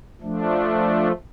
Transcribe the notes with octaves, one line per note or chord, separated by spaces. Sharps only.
F3 A3 D4